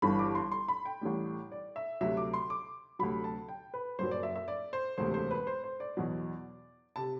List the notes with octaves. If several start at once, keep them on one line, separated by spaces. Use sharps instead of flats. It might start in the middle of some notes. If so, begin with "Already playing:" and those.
G1 G2 E3 G3 B5
D6
C6
C6
B5
G5
A1 A2 G3
D5
E5
D2 C3 F#3 E5
D6
C6
D6
D2 C3 F#3 B5
A5
G5
B4
F#1 F#2 F#3 C5
D5
E5
E5
D5
C5
E1 D2 C3 C5
C5
B4
C5
C5
D5
E2 B2 F#3
C3 A5